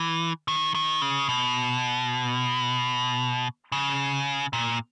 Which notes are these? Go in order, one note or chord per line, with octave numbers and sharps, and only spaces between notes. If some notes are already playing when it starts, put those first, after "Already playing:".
Already playing: E3
D#3
D#3
C#3
B2
C#3
A#2